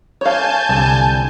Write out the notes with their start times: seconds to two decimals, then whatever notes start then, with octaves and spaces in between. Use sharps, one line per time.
0.21 C#5 F5 G#5 A5 G6
0.69 C2 D3 G3